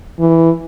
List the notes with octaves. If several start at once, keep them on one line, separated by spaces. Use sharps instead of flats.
E3